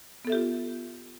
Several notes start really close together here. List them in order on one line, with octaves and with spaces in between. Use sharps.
B3 A4 E5 G4 F4